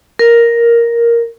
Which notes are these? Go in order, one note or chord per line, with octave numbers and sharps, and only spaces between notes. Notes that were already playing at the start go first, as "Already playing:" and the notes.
A#4